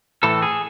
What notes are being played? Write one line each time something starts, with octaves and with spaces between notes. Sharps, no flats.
A2 E3 A3 A4
G#4